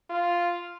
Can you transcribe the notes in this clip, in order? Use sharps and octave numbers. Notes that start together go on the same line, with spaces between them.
F4